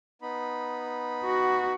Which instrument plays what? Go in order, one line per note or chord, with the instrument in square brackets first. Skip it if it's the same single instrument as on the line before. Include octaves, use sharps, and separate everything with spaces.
[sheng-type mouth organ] B3 D#4 B5
[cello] F#4